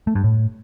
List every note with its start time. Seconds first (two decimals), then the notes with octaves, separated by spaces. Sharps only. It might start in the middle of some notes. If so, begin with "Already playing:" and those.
0.07 A3
0.15 G2
0.24 A2